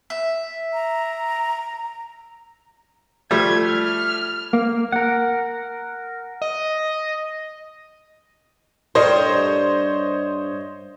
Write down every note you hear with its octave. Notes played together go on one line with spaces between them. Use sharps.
E5
A#5
F3 G3 A3 G#6
F6
A#3
A#4 F#5
D#5
G2 G3 A#4 C5 C#5 D#5